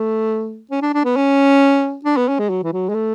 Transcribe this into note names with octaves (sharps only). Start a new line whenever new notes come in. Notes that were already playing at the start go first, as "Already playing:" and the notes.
Already playing: A3
C#4
D4
D4
B3
C#4
D4
B3
C#4
G#3
F#3
E3
F#3
G#3
A3